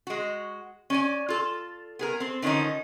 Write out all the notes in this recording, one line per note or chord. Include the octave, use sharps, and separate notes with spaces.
G#3 F#4
C#4 D5 G#5
F4 A4
B3 G#4 A#4
C4 A4
D3 D#3 F3 C#4 D#4